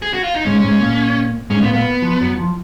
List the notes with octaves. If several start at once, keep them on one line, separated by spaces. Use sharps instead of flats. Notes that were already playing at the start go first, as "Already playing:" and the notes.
G#4
F#4
F4
D#4
G#2 G#3 C#4
G#2 G#3
A#2 A#3
G#2 G#3 C#4
A#2 A#3 B3
A#2 A#3 B3
F3
F#2 F#3
F3